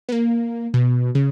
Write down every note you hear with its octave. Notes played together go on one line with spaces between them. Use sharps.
B3
A#3
B2
C#3